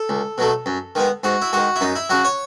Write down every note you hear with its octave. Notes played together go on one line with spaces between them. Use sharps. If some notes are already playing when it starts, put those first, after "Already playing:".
Already playing: A4
C#2
B2 F#3 A3
F#2
D#3 G#3 B3
G#2 F#4
E4
D#3 G#3 F#4
E4
F#2 D#4
E4
C#3 F#3 F#4
C#5